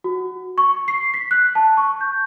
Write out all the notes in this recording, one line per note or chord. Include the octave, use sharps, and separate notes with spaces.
F#4
C#6
C7
B6
F#6
A5
C#6
G6